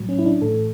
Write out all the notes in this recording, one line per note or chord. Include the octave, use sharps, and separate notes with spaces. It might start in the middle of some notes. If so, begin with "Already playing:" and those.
Already playing: A2 F#3
C#4
E4
D4
A2 E3 A4